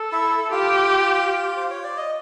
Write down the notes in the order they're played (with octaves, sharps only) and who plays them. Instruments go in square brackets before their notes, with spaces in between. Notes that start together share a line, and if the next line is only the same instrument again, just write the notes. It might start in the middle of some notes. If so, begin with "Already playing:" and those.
Already playing: [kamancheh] A4
[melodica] E4 E5
[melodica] F4 F5 [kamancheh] G4
[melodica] C5
C#5
D5
D#5